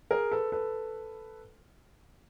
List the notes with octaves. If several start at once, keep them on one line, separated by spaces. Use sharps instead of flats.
G#4 A#4
A4 B4
A4 B4